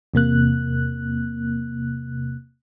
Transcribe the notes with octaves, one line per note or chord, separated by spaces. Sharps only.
E2 C3 A#3 F#6